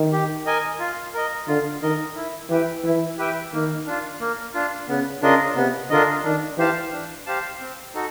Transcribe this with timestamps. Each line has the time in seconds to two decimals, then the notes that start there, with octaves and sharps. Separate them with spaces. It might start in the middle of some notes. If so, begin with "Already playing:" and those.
Already playing: D#3
0.12 G4
0.46 A#4 D#5 G#5
0.79 F4
1.14 A#4 D#5
1.48 D3 F4
1.82 D#3 A#4 D#5
2.16 E4
2.49 E3 G4 B4 E5 G5
2.83 E3 E4
3.18 G4 B4 E5 G5
3.52 D#3 A#3
3.86 D4 F4
4.20 A#3
4.54 D4 F4
4.88 C#3 B3
5.22 C#3 D4 F4 A#4 D#5
5.56 C3 B3
5.90 D3 D4 F4 A#4 D#5
6.24 D#3 D4
6.58 E3 G4 C5 F5 A5
6.92 D4
7.26 G4 C5 F5 A5
7.61 C4
7.94 D#4 F#4 A4